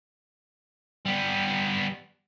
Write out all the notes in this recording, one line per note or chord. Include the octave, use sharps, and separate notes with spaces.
G3 B3